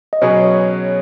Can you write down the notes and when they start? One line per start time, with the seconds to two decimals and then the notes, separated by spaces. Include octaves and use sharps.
0.13 D#5
0.21 B2 F#3 C#4 G#4 B4 C#5